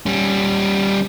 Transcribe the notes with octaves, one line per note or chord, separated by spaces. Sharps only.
G3 C#4